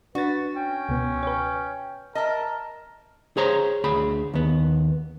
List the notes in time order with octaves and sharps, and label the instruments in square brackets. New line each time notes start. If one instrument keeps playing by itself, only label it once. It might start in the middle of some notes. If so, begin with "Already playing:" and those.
[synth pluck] D4 A6 [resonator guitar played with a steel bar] F#4 [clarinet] B4
[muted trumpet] C#4 [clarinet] G5
[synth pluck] C#2 B2 B3
B4 C#5
[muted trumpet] A#4 [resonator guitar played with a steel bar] D#5 E5 [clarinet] A5
[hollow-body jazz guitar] G#4 C5 C#5 A#5
D2 G#4 B5
D#2 B3